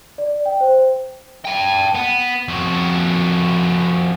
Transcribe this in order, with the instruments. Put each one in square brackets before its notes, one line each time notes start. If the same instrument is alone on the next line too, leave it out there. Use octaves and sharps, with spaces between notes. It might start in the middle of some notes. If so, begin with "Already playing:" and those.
[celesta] D5
G5
C5
[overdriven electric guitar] G5 A5
B3
F2 F#4